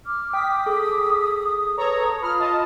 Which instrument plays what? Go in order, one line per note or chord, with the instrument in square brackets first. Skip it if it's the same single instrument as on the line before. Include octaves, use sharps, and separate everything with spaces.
[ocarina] D6 [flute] F6
[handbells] G5 [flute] D#6 [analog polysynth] B6
[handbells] G#4 A4
[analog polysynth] A4 C#5 A#5 [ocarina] B4
[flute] F4 [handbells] B5 [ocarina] D#6 [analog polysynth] F6
[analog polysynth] D#5 A5